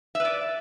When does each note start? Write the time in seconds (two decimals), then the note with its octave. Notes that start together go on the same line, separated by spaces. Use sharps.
0.15 E5
0.20 B4
0.25 D5